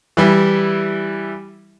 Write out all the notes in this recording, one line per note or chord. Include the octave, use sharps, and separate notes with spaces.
E3 G3 E4